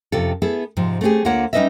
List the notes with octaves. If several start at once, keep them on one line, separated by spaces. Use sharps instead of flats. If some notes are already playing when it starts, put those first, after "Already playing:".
F2 C3 C#4 F4 A4
B3 E4 G#4 A4
G#2 C3 F3
A3 C4 C#4 F4 G4 G#4
D2 D3 A#3 F4 C#5 F#5
G3 C#4 D#4 B4 D#5 E5